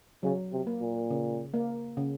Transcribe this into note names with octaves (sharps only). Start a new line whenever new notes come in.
C#3 F#3
C3
A#3
A#2
C#3
A#3
C#3